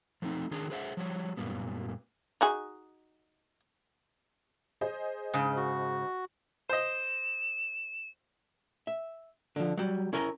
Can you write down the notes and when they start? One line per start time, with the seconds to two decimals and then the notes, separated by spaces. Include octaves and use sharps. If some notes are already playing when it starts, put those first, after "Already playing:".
0.22 F3 A3 C4 D#4
0.51 D#3 D4 G#4 A#5
0.70 G#4 C5 E5 F#5
0.97 F3 G3 C#5
1.37 F#2 A#2 G3 B3
2.41 D#4 F#4 G#4
4.81 G#4 C5 D#5
5.34 G#2 C#3
5.57 F#4
6.69 C5 D#5 E7
8.87 E5
9.56 D3 F3
9.77 F#3 G3
10.13 C#4 E4 A#4 A#5